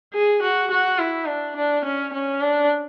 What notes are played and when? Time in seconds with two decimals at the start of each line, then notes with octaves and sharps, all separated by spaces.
0.14 G#4
0.42 F#4
0.71 F#4
0.99 E4
1.27 D4
1.56 D4
1.85 C#4
2.14 C#4
2.41 D4